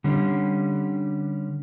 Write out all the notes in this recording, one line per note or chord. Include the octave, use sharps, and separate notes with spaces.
D3 G3 C#4